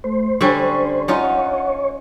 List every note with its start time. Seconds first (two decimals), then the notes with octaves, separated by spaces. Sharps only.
0.04 A3 C5
0.41 D3 G3 C#4 C#6
1.08 C#4 D#4 F4 C#5 F#5